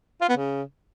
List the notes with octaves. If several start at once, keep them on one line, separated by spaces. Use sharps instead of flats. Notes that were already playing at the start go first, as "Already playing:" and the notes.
F4
B3
C#3